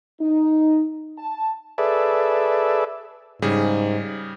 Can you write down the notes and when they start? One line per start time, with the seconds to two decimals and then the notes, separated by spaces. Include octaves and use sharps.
0.21 D#4
1.19 A5
1.78 G#4 A4 B4 D5 E5
3.42 G#2 C#3 G3 G#4